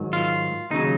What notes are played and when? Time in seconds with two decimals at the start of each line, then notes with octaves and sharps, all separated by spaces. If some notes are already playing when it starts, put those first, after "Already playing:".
Already playing: G#2 D#3 F#3
0.13 F4
0.71 D#2 C#3 F#3 D#4